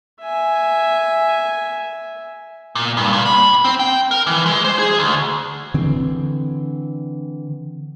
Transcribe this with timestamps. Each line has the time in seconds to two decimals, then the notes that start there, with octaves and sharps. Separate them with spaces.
0.20 E5 G#5
2.75 A#2
2.97 G2
3.13 A#2
3.25 B5
3.64 C4
3.79 G5
4.11 A#4
4.27 E3
4.46 G#3
4.64 C5
4.79 G#4
4.99 D2
5.74 D3 E3 C4